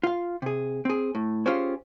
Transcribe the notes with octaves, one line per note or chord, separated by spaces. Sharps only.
F4 F5
C3 G#4
C4 G#4
A2
C#4 F4 G4 G#4 C5 C#5